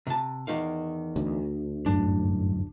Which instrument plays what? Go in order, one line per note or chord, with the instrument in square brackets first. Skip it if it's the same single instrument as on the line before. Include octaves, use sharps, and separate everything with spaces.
[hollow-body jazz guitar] C3 A5
E2 D#3 F5
[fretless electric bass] D2
[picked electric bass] G1 F#2 A2 [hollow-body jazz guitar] D4